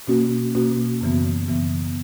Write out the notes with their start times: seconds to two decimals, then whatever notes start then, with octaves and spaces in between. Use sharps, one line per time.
0.07 B2 A#3 C#4 F#4
0.55 B2 A#3 C#4 F#4
1.01 F#2 C#3 E3 B3
1.48 F#2 C#3 E3 B3